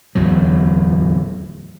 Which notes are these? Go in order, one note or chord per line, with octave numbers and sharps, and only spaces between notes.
D1 E2 A2 F#3